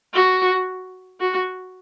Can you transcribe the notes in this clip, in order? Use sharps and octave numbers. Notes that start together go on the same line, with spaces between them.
F#4
F#4